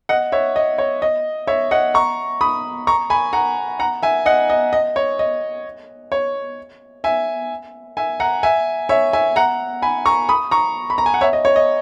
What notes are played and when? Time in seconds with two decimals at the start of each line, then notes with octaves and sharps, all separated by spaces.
0.09 D#5 F#5
0.32 C#5 E5
0.56 D#5
0.78 C#5
1.02 D#5
1.47 C#5 E5
1.71 D#5 F#5
1.94 A#5 C#6
2.41 B5 D#6
2.87 A#5 C#6
3.10 G#5 B5
3.33 F#5 A#5
3.79 F#5 A#5
4.03 E5 G#5
4.26 D#5 F#5
4.50 D#5
4.73 D#5
4.96 C#5
5.19 D#5
6.12 C#5
7.04 E5 G#5
7.97 E5 G#5
8.20 F#5 A#5
8.43 E5 G#5
8.89 C#5 E5
9.13 E5 G#5
9.36 F#5 A#5
9.82 G#5 B5
10.06 A#5 C#6
10.29 B5 D#6
10.51 A#5 C#6
10.90 B5
10.98 A#5
11.06 G#5
11.14 F#5
11.21 C#5 E5
11.33 D#5
11.45 C#5
11.56 D#5